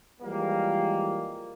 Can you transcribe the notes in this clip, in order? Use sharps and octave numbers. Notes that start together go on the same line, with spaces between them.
E3 F3 G3 G#3 A#3